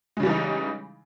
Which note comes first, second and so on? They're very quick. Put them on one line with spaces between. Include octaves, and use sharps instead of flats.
G#3 C#3 G3 E3 D#4